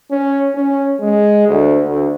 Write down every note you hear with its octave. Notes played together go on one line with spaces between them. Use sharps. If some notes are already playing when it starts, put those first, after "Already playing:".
C#4
C#4
G#3
D2
D2